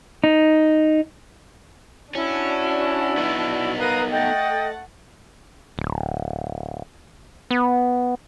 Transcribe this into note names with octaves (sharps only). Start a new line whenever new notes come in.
D#4
C#4 D4 E4 F#4
B3 D#4
A#4 B4 F5 A#5 D#6
A3 D#5 F#5 G5 A6
D1
B3